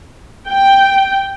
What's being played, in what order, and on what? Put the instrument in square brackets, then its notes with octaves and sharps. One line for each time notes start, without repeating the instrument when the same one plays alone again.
[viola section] G5